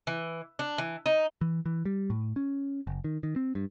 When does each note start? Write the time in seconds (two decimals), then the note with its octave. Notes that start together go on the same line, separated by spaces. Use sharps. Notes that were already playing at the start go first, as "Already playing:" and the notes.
0.07 E3
0.59 D4
0.78 E3
1.06 D#4
1.41 E3
1.66 E3
1.85 G3
2.10 A2
2.36 C#4
2.87 F#1
3.04 D#3
3.23 D#3
3.36 C4
3.55 G2